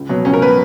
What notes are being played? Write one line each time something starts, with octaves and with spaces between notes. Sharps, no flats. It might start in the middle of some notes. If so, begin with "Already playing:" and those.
Already playing: C#2
B2 F#3
C#2 C#4
A#4
B2 F#3 B4